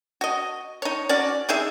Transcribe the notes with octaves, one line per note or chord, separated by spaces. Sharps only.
F#4 D#5
D#4 C#5
C#4 F#4 D5
C3 D#4 G#4 E5